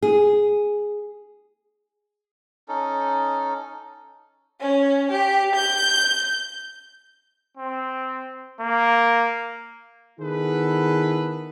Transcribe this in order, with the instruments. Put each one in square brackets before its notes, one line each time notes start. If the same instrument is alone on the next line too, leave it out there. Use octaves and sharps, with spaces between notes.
[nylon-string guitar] G#4
[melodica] C#4 D#4 A4
[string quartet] C#4
G4
G6
[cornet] C4
A#3
[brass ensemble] D#3 B3 E4 G#4 A4 B4